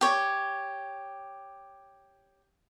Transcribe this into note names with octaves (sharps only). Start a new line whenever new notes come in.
G4 C#5